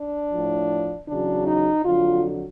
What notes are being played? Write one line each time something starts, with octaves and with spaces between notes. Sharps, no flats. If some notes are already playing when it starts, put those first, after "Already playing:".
Already playing: D4
A2 F3
E2 C#3 F#3 D4
D#4
F2 D3 F#3 F4